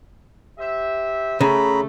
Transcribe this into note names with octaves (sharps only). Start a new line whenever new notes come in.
G4 C5 E5
C#3 A3 A#5 B5